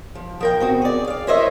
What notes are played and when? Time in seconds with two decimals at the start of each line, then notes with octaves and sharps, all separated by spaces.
0.15 F3
0.40 F3 A#4 G5
0.60 B2 C4 F#4
0.82 G#4 D5
1.08 D5 F5
1.27 E4 A#4 C5 C#5 D#5 E5